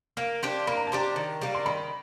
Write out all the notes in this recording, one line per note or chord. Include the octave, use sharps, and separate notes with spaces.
A#3 F5
D4 G4 C5
A#3 B5
A#5
A5
D4 G4 C5 A#5
D#3
G3 A#3 D4
C6
D#3 B5